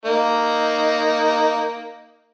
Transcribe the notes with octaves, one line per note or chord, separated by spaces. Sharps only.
A#3 D#4